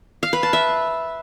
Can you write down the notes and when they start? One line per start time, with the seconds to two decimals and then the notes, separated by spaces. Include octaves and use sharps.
0.23 F5
0.33 B4
0.43 A5
0.53 E5